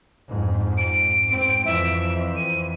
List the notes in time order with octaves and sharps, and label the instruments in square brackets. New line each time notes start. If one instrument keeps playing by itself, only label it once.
[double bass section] F2 G#2
[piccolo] D7
[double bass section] G#2 C4
[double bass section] F2 E3 [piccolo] E5
[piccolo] D#7